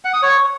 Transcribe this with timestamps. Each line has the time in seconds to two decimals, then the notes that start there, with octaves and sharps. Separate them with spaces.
0.05 F#5
0.14 D#6
0.22 C#5